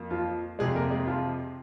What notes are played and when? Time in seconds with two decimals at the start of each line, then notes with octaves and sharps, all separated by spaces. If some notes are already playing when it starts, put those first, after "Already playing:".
Already playing: F2 A#3
0.10 F3 F4
0.59 F2 C3 G#3 G#4
0.75 A#3 A#4
0.91 G#3 G#4
1.07 F3 F4